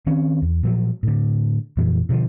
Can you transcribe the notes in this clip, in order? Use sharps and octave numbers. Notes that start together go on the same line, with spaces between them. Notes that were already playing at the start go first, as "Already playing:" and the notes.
D#3 C4 C#4
E2
A#2 F3 F#3
A2 D3
F2 A#2 E3
B2 D3 E3 F3